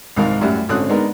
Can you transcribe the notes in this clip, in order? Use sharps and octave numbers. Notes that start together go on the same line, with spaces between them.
C2 G#2 C3 D#3 A#4 F5
F#2 A2 G3 E5 F#5
G#1 D3 C4 C#4 D#6 F#6
G#3 B3 D4 D#4 A#4